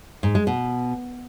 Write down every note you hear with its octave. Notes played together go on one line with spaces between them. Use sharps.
G#2
G#3
B2